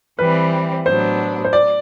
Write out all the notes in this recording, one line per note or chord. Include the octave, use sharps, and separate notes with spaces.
E3 G3 C4 B4
A2 F#3 B3 D4 C5
C5
D5